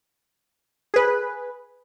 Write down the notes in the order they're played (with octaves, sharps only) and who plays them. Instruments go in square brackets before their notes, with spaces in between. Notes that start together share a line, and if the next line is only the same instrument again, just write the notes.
[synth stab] G#4 B4